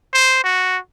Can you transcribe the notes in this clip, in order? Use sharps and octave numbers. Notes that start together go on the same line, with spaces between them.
C5
F#4